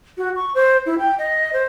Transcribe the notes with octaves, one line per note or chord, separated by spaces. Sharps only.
F#4
C#6
C5
E4
G5
D#5
C5